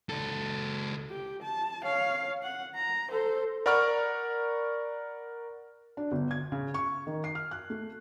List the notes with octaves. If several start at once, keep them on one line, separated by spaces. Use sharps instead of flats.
C#2 A4
G4
A5
C#5 F5
F#5
A#5
A4 C5
A#4 D5 F#5 B5 C#6 F6
D4
G1
G#6
C#3
C#6
D#3
C7
F6
F#6
A3